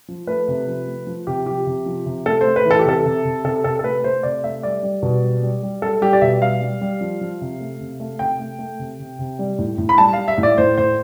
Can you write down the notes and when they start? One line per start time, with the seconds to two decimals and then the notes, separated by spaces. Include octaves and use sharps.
0.08 F3
0.27 A3 B4
0.48 C3
0.67 F3
0.87 A3
1.07 F3
1.27 C3 G4
1.46 F3 G4
1.66 C3
1.86 F3
2.06 C3
2.26 A3 A4
2.41 C5
2.46 A3
2.56 B4
2.65 E3
2.71 A4
2.79 G4
2.85 C3 A4
3.05 C3
3.25 C3
3.44 C3 A4
3.64 C3 A4
3.79 A4
3.84 A3 B4
4.04 A3 C5
4.23 C3 D5
4.44 A3 E5
4.63 G3 D5
4.83 G3
5.02 B2
5.23 G3
5.43 G3
5.63 G3
5.82 G3 A4
6.01 G3 G4
6.13 D5
6.21 B2 E5
6.41 G3 F5
6.62 G3
6.81 G3
7.01 F3
7.21 F3
7.41 C3
7.60 A3
7.80 C3
8.00 A3
8.19 C3 G5
8.39 A3
8.59 A3
8.79 C3
8.99 C3
9.19 C3
9.39 G3
9.58 A2
9.78 A2
9.89 B5
9.98 G3 A5
10.13 G3 F5
10.28 E5
10.38 A2
10.43 D5
10.58 A2 C5
10.78 A2 C5